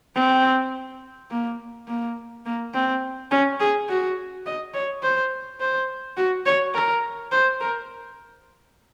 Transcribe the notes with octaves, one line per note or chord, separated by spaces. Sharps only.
C4
A#3
A#3
A#3
C4
C#4
G#4
F#4
D#5
C#5
C5
C5
F#4
C#5
A#4
C5
A#4